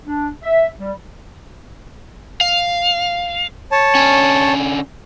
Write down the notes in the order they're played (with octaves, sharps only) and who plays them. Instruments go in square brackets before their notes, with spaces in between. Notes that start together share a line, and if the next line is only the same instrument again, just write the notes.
[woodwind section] D4
E5
G3
[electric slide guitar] F5
[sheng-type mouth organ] C#5 A5
[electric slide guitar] D3 C#4